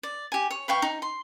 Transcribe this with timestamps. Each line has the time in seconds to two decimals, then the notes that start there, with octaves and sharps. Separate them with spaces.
0.03 D5
0.32 G4 G#5
0.51 C#5
0.68 B4 F5 G5 C#6
0.82 D#4
1.02 C6